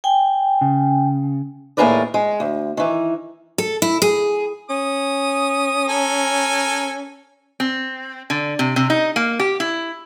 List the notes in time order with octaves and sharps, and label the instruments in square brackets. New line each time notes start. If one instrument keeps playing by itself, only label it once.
[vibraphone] G5 G#5
[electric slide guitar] C#3
[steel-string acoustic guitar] D#2 A2 G#4 A#4 B4 D5
G#3
D2
D#3 E3
A4
E4
G#4
[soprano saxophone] C#4 [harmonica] D#6
[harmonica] A4 A#4 G#5
[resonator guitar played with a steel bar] C4
D3
C3
C3
D#4
A#3
G4
E4